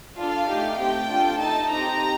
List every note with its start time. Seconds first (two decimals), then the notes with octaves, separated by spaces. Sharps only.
0.19 D4 F4 A4 F5
0.50 A3 D#4 G4
0.80 A3 C4 G4 G5
1.11 D4 F4 A4
1.42 A3 D#4 A4 A5
1.73 C4 D#4 G4 A#5